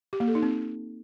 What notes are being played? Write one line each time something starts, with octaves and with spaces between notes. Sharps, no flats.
G4
A#3
A4
D#4
C4